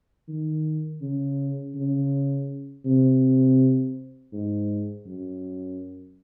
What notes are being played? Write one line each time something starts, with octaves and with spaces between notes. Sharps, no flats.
D#3
C#3
C#3
C3
G#2
F#2